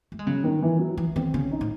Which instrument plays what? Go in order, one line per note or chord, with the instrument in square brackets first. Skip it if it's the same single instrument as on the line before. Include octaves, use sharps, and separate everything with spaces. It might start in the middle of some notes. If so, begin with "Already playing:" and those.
[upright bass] A3
G#3
[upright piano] C#3 [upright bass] F#3
[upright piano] D#3
E3
F#3
[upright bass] E3
[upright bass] D#3 [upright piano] C4
[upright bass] C#3 [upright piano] C#4
[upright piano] D#4
[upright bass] A2